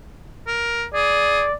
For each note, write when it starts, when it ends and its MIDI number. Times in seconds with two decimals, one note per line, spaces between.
0.47 0.85 70
0.94 1.43 68
0.94 1.54 74